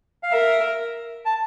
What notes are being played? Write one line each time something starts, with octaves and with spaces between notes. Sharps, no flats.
F5
A#4 E5
A5